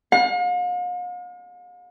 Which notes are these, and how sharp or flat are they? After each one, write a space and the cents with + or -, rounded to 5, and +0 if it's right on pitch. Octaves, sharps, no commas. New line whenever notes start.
F5 +45